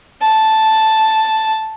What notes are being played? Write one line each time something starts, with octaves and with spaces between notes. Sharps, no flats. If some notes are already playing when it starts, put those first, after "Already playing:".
A5